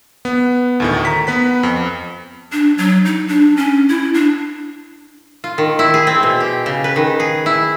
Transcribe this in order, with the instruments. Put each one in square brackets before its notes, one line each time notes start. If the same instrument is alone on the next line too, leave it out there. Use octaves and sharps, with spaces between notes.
[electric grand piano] B3
D2 A2 D#3
A#5 B6
B3 B4 B6
F2
[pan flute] D4
F#3
D#4
D4
C#4
E4
D4
[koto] F4
D#3
E4
G#4
C4
B2
G4
C#3
B4
D#3
G#4
E4